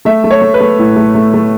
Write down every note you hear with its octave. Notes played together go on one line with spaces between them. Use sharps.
A3 E5
A3
C#5
A3
B4
A3
A2
A3
A3
A3